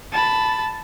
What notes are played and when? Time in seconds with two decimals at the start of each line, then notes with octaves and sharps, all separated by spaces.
0.12 A5 B5